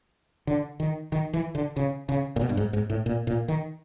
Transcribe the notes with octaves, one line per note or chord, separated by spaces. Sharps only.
D3
D#3
D#3
E3
D3
C#3
C#3
A#2
B2
G2
G#2
G#2
A2
A#2
A#2
D#3